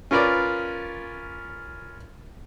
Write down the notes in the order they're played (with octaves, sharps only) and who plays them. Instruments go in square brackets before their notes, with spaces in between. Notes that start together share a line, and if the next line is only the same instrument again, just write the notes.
[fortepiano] C#4 F4 A#4 B4 D5